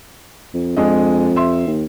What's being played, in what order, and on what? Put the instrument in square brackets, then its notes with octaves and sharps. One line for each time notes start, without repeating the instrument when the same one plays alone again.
[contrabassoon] F2
[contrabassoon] F2 [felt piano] G#3 D4 D#5
[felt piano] E5 C6
[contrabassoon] D#2